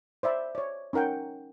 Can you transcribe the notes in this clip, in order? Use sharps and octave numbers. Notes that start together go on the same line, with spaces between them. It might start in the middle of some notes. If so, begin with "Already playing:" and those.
C5 D5 E5 B5
C#5 D5
C#4 D#4 A#4 F#5 G5